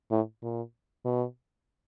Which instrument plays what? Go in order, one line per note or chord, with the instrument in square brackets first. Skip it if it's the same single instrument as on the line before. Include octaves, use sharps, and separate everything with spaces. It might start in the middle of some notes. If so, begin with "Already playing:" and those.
[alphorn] A2
A#2
B2